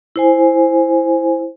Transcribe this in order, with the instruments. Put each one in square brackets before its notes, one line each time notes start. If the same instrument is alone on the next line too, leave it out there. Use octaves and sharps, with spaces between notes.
[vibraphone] E4 C5 G#5